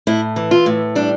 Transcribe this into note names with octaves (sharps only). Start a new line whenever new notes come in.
A2 E4
E3
F4
A2
G3 D4